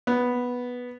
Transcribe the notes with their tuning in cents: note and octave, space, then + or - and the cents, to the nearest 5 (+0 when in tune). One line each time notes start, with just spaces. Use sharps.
B3 -5